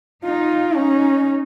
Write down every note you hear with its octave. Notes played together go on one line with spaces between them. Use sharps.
D#4 F4
C#4 D#4